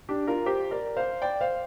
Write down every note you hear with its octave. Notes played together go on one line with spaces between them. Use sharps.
D4 G4
F4 A#4
G4 C5
A#4 D5
C5 F5
D5 G5
C5 F5